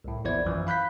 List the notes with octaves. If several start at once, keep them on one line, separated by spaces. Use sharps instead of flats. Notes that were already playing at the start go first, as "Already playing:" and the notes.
C2 A2
A#1 E2 E4 C5 D5 G#6
F#2 E3 F3
F5 B5 F#6 G6 B6